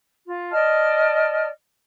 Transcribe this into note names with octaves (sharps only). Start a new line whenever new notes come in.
F4
D5 D#5 A5 F6